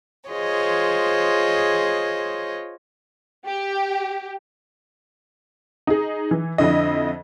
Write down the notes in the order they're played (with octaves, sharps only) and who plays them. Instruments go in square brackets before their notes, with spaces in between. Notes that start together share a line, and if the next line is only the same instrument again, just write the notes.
[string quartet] F4 G#4 C5 C#5 D#5
[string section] G4
[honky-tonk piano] D#4 G#4
E3
F2 D3 E4 D#5